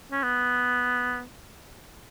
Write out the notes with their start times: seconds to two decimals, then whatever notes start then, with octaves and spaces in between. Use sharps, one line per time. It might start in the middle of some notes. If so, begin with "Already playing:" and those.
0.12 C#4
0.23 B3